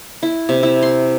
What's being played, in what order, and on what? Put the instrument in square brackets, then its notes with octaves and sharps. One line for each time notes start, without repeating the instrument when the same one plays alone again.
[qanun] E4
C3
E4
C6